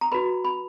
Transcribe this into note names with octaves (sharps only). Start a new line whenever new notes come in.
A#5
F#4 B4 B5
B5